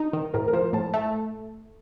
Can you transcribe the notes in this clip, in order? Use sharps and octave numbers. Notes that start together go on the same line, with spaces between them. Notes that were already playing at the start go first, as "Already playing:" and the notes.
Already playing: D#4
D#3
A2 A#4
A#4
F3 C5
A2 A5
A3 A5